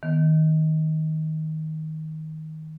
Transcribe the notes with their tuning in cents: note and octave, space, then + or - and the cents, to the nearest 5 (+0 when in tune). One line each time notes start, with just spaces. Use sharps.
D#3 +15 B3 +0